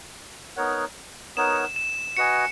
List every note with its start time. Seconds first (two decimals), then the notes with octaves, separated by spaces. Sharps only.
0.56 B3 D#4 A#4 C#5 F#5
1.36 B3 D#4 A#4 C#5 F#5 E7
1.76 E7
2.17 F#4 B4 D#5 G#5 C#7